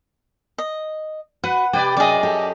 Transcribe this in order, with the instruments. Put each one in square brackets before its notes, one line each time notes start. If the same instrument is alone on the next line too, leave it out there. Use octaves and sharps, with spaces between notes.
[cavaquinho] D#5
[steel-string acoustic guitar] F#4 [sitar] B4 [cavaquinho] F#5
[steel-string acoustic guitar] C3 G5 [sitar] G4 B4 D5
[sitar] F#2 D#5 [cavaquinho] G#4 D5
[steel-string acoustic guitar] G4 A4